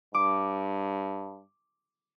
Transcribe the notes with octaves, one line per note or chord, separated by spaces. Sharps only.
G2 D6